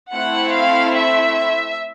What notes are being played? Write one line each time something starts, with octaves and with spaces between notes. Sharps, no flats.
A3 C4 E4 F#5
F5
E5